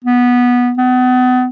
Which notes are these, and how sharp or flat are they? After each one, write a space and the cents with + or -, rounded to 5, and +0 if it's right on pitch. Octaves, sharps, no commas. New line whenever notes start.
B3 -10
B3 +35